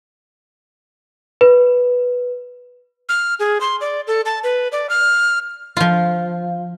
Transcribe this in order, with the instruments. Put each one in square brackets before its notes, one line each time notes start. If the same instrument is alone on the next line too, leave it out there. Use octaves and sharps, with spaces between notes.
[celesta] B4
[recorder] F6
G#4
C6
D5
A4
A5
B4
D5
F6
[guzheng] F3 F4